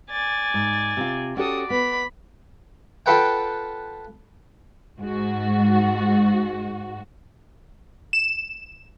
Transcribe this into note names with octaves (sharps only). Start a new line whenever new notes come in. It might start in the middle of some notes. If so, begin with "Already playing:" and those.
D5 G#5 A6
G#2
C3 F4
C#4 F#4 G4 A4 D5 D#6
B3 B5
F4 A4 B4 F#5 G5
G#2 F#4
E7